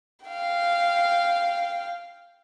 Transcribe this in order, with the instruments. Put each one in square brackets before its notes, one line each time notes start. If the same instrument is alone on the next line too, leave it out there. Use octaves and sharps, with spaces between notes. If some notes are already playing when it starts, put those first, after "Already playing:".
[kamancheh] F5 G5